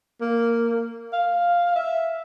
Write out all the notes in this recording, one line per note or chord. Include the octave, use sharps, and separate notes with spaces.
A#3
F5
E5